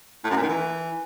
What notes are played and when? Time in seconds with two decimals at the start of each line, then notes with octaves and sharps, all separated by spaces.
0.24 A2
0.30 F#2
0.36 A#2
0.43 D#3
0.49 E3